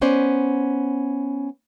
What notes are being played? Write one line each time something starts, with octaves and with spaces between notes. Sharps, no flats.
B3 C#4 C5 D5